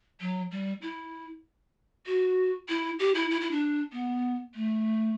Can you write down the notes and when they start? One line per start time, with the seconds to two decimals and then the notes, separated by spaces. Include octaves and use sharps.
0.21 F#3
0.51 G3
0.82 E4
2.06 F#4
2.69 E4
2.99 G4
3.15 E4
3.30 E4
3.41 E4
3.51 D4
3.92 B3
4.55 A3